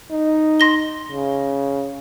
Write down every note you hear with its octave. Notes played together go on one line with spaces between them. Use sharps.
D#4
C6 A#6 G7
C#3